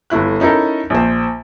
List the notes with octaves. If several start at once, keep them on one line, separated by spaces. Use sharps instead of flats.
G1 A3 E4 F#6
C#4 D#4 E4 A4 A#4
A#1 C5